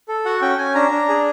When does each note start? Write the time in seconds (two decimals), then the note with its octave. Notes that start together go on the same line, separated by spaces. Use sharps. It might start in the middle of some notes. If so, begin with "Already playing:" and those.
0.08 A4
0.26 F#4 F#5
0.42 C#4 G5
0.58 C#4 G#5
0.75 D4 A#5
0.91 D4
1.08 G#4